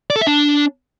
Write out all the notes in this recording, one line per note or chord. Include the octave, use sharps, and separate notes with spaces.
D5
A4
E5
D4